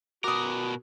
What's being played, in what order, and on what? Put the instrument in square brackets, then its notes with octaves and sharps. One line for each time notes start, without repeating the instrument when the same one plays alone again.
[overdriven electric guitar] B2 A#4 [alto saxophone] F#4 [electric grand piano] D6 D#6